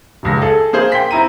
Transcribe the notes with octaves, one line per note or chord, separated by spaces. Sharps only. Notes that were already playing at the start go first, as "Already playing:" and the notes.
D#1 C#2 A#6
G#4 A4
A#3 G#4 C5
G5 C6 B6
C4 E4 A#5 D#7